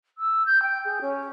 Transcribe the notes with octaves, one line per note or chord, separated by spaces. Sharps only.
E6
G6
G5
G#4
C#4